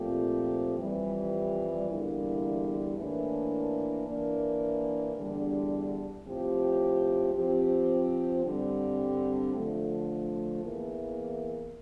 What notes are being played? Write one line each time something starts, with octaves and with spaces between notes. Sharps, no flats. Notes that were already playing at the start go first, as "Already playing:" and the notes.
Already playing: A#2 F3 A3 C4 G4
F2 E3 G3
E2 D3 G3 A#3 E4
A2 E3 A#3 D4 A4
E3 A#3 D4
E2 D3 G3 D4
A2 F3 C4 G4
F3 C4 G4
G2 D3 G3 C4 G4
D3 F3 A3
E2 E3 A#3